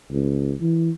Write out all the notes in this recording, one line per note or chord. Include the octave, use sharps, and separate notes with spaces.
C#2
E3